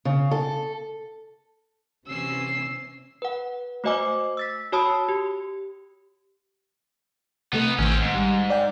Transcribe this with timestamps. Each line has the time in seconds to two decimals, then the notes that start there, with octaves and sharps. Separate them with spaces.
0.05 C#3
0.31 A4
2.07 C3 E3 C#4 E6 C7
3.22 B4 F#5
3.84 A3 F#4 C5 D#5 G#5 D6
4.37 E6 A6 B6
4.72 F#4 C#5 A5 B5 D#6 E6
5.09 G4
7.53 C3 A3 B3 D#4
7.79 A1 D#3 C4 C#4
8.02 G#2
8.15 G3
8.50 D5 G5